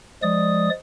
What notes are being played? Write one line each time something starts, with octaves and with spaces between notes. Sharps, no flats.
F3 G#3 D5 D#6